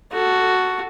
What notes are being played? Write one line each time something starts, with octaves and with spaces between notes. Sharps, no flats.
F#4 A4